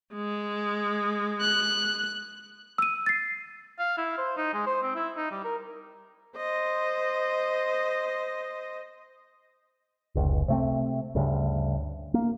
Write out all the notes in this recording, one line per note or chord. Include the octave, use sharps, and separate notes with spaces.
G#3
F#6
E6 D#7
A6 C7
F5
E4
C5
D#4
G#3
C5
C4
E4
D#4
G3
A#4
C5 D#5
F1 C#2
C3 A3 C4
D2 G2 C#3
A#3